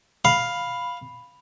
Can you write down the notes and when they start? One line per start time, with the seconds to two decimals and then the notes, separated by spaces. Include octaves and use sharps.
0.25 F5 B5